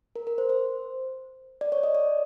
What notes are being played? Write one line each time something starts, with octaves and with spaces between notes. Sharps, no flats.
A#4
A#4
C5
C5
D5
C#5
D#5
D5